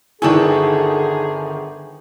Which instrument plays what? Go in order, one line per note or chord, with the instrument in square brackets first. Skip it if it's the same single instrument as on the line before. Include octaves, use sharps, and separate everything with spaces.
[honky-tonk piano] G1 D#3 G#5 [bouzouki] D4 F#4 A4 [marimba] E4 [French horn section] G#4